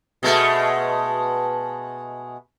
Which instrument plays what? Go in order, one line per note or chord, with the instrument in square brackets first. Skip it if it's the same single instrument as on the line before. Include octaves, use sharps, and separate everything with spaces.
[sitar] B2 G#3 A3